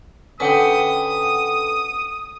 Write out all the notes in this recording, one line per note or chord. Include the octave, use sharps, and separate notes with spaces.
D3 C#4 B4 F#5 G5 D#6